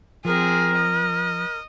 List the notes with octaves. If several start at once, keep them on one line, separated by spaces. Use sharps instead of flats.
F3 C4 G#4 A#4
D#5